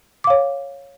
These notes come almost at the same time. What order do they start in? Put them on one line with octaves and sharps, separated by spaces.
D6 F5 C#5